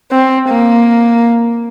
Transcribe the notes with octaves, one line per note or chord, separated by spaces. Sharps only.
C4
A#3